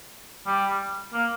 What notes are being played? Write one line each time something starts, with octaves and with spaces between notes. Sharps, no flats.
G3
A#3